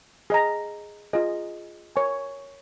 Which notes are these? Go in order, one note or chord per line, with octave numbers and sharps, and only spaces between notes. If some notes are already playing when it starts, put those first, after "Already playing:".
G#4 D#5 A#5
F4 G#4 D#5
A#4 C#5 G#5 C#6